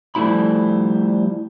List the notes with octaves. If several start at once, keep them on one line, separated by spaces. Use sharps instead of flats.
F3 G3 A3 E4 B5